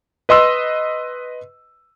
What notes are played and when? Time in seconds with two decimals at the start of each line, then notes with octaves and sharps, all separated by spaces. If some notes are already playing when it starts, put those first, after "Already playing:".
0.29 B4 D#5 C6 E6